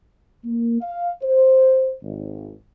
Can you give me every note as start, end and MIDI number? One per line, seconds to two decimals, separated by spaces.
0.44 0.78 58
0.81 1.09 77
1.23 1.92 72
2.03 2.53 32